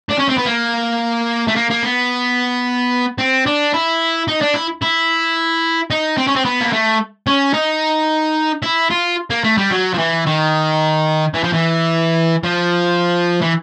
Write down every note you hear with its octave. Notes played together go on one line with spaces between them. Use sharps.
D4
C#4
C4
B3
A#3
A3
A#3
A#3
B3
C4
D4
E4
D#4
D4
E4
E4
D#4
C4
C#4
C4
B3
A#3
A3
C#4
D#4
E4
F4
A#3
A3
G3
F#3
F3
E3
D#3
E3
F3
E3
F3
E3